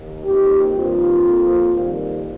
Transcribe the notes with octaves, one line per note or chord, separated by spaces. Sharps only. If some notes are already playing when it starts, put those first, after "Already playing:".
Already playing: D#2
F2 F3 A#3 D#4 G4
G2 D#3 A#3 C4 F4
F2 F3 A#3
F2 D#3 G3 A#3